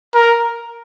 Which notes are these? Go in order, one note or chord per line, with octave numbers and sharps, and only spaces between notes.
A#4